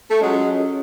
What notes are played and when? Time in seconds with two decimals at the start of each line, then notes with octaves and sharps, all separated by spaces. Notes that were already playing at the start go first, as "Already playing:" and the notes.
0.09 A3
0.20 F#3 G#3 C#4 F4 G#4 C#5